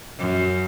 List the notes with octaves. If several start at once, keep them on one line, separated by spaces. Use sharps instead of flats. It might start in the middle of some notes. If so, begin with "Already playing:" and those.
F#2